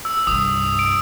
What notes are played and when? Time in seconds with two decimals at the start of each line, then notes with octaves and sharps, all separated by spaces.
0.05 E6
0.27 C2 G2 D#6
0.79 D7